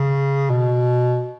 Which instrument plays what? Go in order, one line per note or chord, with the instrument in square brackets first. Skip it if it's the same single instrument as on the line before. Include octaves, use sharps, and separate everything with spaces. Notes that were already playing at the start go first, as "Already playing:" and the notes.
Already playing: [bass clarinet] C#3
B2